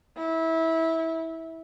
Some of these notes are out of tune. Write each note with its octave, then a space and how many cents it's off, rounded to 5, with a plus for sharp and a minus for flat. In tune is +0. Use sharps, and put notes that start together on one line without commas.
E4 -20